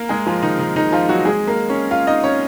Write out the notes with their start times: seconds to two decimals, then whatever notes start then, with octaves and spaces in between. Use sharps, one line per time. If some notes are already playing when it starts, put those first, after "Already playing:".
Already playing: A#3 A#4
0.09 G#3 G#4
0.26 F3 F4
0.43 D#3 D#4
0.58 D#3 D#4
0.76 D#3 D#4
0.92 F3 F4
1.09 F#3 F#4
1.25 G#3 G#4
1.47 A#3 A#4
1.69 C#4 C#5
1.91 F4 F5
2.07 D#4 D#5
2.24 C#4 C#5